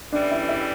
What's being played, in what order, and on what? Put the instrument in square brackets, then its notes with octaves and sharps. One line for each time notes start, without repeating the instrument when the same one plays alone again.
[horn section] A2 E3 G3 [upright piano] D4 D5
[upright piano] E4 E5
E4 E5